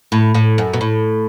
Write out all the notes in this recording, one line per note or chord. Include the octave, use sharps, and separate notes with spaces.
A2
A2
F#2
B2
A2